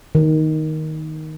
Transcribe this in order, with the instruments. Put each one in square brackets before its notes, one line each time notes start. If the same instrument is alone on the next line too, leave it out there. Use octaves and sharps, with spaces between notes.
[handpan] D#3